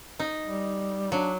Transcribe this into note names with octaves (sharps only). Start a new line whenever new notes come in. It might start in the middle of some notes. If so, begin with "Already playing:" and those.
D#4
G3
F#3 D4